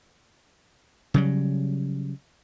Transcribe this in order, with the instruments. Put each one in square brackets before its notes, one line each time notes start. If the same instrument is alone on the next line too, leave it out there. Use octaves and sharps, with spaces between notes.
[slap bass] C#3 F#3 G3